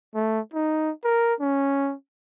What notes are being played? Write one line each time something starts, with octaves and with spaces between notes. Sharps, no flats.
A3
D#4
A#4
C#4